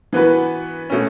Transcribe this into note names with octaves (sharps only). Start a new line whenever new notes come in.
E3 B3 F#4 B4
B2 A3 C#4